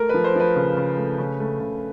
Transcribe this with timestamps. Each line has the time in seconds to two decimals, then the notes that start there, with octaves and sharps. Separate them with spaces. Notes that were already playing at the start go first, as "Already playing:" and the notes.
Already playing: A3 A#4
0.09 F3 B4
0.24 C5
0.35 F3 B4
0.56 C#3
0.77 C#3
0.98 A3
1.18 C#3
1.40 A3
1.60 C#3